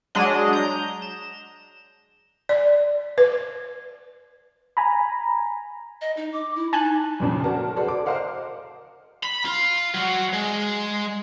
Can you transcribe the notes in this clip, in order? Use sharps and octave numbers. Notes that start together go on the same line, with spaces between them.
F#3 G#3 D4 D#5
A#5 G6
E7
D5
B4
G#5 A#5 B5
D#5
D#4
D6
E4
D#4 G#5 A5 F#6
F2 A#2 C#3
F#4 A4 A#4 A5
F#4 G#4 A4 B4 C5 D5
D6
A#4 C5 D#5 F5 F#5 A5
B5
F4
F#3
G#3